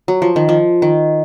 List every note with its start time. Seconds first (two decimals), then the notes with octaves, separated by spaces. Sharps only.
0.08 F#3
0.22 F3
0.36 D#3
0.49 F3
0.82 D#3